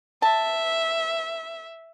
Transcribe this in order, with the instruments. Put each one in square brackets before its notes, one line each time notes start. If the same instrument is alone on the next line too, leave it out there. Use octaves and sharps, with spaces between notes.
[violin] E5 [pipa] A5